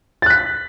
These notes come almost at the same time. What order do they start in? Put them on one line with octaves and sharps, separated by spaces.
A6 F#6 B6